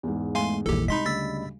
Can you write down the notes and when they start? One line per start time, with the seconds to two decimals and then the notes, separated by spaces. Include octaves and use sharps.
0.03 E2 G#2
0.35 G#3 A3 F5 G#5 C6
0.66 A#1 E2 D#3 E3 G3 G#3 G4 A4
0.88 C2 G#3 D#4 D#5 B5 C6 B6
1.05 D2 C#3 G3 E6 A6 B6